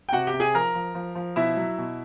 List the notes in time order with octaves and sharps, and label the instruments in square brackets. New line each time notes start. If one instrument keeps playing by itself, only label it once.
[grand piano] G5
C3 F#4 F#5
G4 G5
C3
G#4 G#5
F3 A#4 A#5
F3
F3
F3
B2 E4 E5
F#3
B2